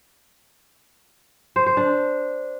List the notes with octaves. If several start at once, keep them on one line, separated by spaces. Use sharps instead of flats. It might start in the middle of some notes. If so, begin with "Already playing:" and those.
C5
C5
D4